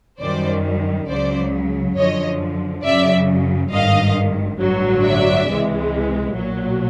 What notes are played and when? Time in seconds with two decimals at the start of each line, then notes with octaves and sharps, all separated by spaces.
0.21 F#2 D#3 G3 C5 D5
1.09 C#2 C#3 F#3 C5 D5
1.97 F#2 D3 F3 C#5 D#5
2.84 F#2 C#3 F#3 D5 E5
3.72 G#1 G2 D#3 D#5 F5
4.60 A1 G2 D3 F#3
5.04 D5 E5
5.48 C#2 C3 E3 G#3
6.35 B1 A#2 F#3